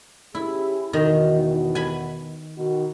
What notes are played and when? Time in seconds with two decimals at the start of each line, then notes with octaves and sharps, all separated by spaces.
0.35 C#4 E4 G4 G#4
0.93 E2 B2 D#3 F#4
1.75 G#5 B5
2.58 B2 D#3 F#4